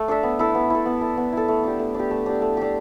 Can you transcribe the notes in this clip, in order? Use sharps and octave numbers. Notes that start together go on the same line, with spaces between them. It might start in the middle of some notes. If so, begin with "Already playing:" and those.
Already playing: A3
D4 A4 E5
B3
E4 A4
B3
E4 A4
B3
E4 A4
B3
E4 A4
A3
D4 G4
A3
D4 G4
A3
D4 G4
A3
D4 G4